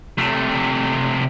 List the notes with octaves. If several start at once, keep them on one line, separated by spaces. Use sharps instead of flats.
C3 A3